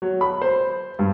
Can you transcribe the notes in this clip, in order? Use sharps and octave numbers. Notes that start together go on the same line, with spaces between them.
F#3
B5
C5
G2